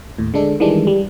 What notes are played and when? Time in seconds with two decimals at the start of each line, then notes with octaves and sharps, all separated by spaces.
0.18 D#2 A2
0.34 D3 G#3 D4 A4
0.60 D#3 E3 G3 G#3 D4
0.87 G3